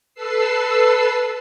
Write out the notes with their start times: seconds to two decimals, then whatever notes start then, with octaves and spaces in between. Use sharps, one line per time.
0.15 A4 B4 E6 C7